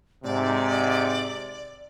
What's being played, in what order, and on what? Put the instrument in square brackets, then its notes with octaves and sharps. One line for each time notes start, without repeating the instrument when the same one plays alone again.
[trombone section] G#2 C3 [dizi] D5